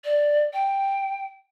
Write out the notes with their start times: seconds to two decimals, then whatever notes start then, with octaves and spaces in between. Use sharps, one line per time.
0.04 D5
0.53 G5